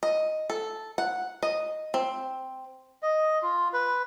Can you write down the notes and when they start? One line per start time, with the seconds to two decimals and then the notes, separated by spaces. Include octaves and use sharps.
0.03 D#5
0.50 A4
0.98 F#5
1.43 D#5
1.94 C4
3.02 D#5
3.42 F4
3.73 B4